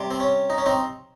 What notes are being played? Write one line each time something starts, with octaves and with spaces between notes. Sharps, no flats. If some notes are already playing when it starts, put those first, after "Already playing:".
Already playing: C3 G3
C4
C#4
D#4
C#4
C4 D#4